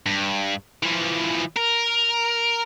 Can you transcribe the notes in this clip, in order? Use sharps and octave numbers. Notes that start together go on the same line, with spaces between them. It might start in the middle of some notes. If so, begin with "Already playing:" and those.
G2
E3 F3
A#4